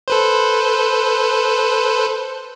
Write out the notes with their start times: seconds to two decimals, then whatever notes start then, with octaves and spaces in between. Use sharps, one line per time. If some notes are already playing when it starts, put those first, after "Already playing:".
0.08 A4 B4 C5